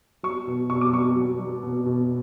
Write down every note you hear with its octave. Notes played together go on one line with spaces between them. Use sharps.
F#3 C#6
B2
B2 C#6
D6
F#3 C#6
F#3
F#3
B2
B2